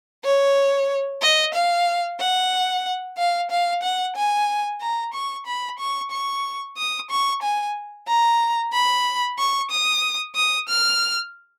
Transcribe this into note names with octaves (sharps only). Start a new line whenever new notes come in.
C#5
D#5
F5
F#5
F5
F5
F#5
G#5
A#5
C#6
B5
C#6
C#6
D#6
C#6
G#5
A#5
B5
C#6
D#6
D#6
F6